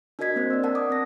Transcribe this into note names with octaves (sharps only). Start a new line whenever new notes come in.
D4 F#4 A#4 D#5 G#6 B6
A#3 C4 D4 C5
D5 E6
A#4 F#5 A5 E6
D6 D#6
C4 A#6